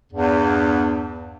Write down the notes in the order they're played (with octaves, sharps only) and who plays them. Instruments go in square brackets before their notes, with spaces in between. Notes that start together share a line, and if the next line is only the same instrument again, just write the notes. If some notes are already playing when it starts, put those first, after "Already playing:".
[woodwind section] E2 G2